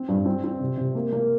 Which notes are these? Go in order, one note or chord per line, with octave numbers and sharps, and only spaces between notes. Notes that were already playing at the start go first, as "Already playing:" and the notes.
Already playing: C4
G2
C4
C4
C3
C3
A#3
A#3